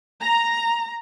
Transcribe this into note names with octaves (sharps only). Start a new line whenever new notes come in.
A#5